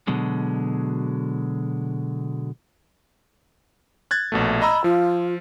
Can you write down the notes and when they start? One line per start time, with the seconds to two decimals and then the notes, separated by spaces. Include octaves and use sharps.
0.07 B2 D3 F#3 G#3
4.11 F#6 G#6 A6
4.32 A#1 B2 A3
4.62 D#5 A#5 B5 E6
4.84 F3 F4